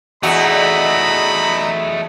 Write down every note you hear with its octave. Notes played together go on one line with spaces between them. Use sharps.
E2 A3 D#4 F#4 D#5 A#5 B5 E6